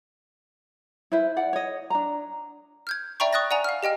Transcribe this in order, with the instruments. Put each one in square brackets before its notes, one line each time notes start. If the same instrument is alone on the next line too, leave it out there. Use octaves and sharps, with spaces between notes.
[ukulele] E4 B4 C5 E5
D5 F#5
C#5 D#5
D4 A#5
[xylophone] F6 G6 G#6
D5 E5 G5 A#5 B5 C#6
C#6 D#6 F#6 A6 A#6
D5 F#5 G#5 A#5 F7
F5 F6
G4 D#5 G5 F6